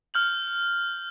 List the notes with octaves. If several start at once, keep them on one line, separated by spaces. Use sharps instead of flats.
F6 G6 F#7